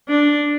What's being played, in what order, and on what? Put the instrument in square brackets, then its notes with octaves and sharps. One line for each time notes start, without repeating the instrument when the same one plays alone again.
[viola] D4